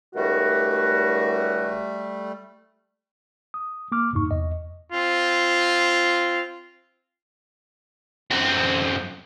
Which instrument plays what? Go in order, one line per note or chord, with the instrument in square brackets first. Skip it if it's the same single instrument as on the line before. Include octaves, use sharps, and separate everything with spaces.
[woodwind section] C#2 D#3 F#4 [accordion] G3 A3
[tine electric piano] D#6
A#3 D6 F6
E2 G2 C3 D#4 C#6
E2 D#5
[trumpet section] C4 F4
[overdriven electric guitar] F#2 C4